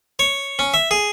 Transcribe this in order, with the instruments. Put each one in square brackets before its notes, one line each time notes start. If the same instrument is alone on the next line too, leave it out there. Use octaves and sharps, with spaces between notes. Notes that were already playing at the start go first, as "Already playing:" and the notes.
[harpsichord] C#5
C#4
E5
G#4